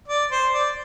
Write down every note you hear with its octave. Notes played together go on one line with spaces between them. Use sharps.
D5
C5
D5